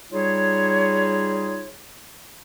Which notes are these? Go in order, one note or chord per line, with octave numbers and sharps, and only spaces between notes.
G3 D#4 F4 G#4 C#5